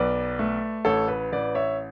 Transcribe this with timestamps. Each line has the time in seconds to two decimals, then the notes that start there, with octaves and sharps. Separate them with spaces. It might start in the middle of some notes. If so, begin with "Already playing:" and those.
Already playing: B1 B4 D5
0.39 A3
0.85 A1 A4 C#5
1.08 B4
1.32 A1 B4 D5
1.55 C#5 E5